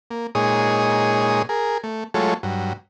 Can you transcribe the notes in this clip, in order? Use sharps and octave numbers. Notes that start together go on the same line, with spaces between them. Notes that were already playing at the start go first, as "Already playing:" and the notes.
A#3
A#2 G#3 D#4 G#4 C#5 D#6
G#4 A#4
A3
F#3 G#3 A3 F4 A4 C#5
G2 F#3